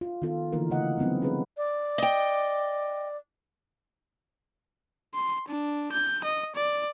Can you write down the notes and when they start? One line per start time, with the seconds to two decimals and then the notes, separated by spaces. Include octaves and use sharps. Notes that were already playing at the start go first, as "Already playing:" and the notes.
0.01 F4
0.22 D#3 B3 F4 A4
0.53 D3 E3 A#3 D#4 A#4
0.70 C#3 A3 D#5 F#5
0.98 F#3 G3 B3 C4 D#4
1.22 C4 C#4 G#4 B4
1.57 D5
1.98 D#5 G5
5.14 C6
5.48 D4
5.92 G6
6.24 D#5
6.55 D5